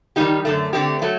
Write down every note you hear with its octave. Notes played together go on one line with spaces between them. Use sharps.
D#3 G3 A#3 D#4 G4
F#2 D3 A3
D3 A3 C4 G4
F#3 A3